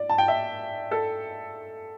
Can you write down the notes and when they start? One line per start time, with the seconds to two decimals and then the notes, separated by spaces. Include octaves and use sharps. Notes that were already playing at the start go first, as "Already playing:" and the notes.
Already playing: D5
0.09 A5
0.18 G5
0.28 E5
0.91 A4